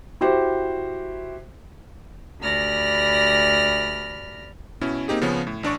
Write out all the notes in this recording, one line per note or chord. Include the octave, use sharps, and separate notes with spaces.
E4 F#4 G4 C5
D2 G4 D5 B5 F6 A#6
B2 C#4 E4
A#3 C4 D#4 G4 G#4
C#3 F3 B3 C#4
A2
A1 D4 D5 C#6